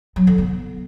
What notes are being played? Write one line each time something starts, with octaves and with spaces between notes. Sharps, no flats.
F#3
D3
B3